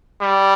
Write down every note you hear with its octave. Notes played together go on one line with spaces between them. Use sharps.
G3